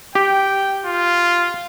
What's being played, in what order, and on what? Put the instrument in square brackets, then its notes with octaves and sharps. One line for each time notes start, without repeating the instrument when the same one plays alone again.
[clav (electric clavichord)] G4 [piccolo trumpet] G5
[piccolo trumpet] F4